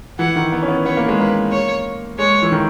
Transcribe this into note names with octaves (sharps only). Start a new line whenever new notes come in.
E3 F#5
D#3
B3
C#4
B3
B3 C#5
A#3
G#3
A#3 B4
C#5
G#3 C#5
E3
D#3